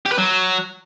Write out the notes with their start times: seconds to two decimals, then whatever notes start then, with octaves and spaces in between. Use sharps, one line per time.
0.06 G4
0.12 B4
0.18 F#3